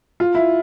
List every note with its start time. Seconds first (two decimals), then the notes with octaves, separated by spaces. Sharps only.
0.20 F4
0.35 E4